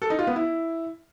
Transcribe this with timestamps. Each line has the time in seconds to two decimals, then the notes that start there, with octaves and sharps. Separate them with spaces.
0.02 A4
0.10 D#4
0.19 F4
0.27 B3
0.36 E4